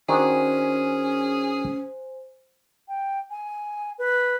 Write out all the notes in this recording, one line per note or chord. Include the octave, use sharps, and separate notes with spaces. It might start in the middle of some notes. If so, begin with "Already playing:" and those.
D#3 C#4 D4 F#4 G#4 C5 G#5
G5
G#5
B4